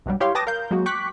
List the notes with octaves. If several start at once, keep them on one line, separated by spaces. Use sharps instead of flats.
B1 G2 F#3 G3
E4 G4 C#5 F5 C6
B4 G5 A5 D6 D#6 A#6
A#4 F5 G6
F#3 G#3 A#3 F#4
G5 C#6 D6 F#6 B6